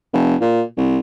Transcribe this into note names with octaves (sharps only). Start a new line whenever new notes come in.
F1
A#2
C2